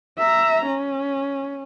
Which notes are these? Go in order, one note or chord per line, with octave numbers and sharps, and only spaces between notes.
E5 A#5
C#4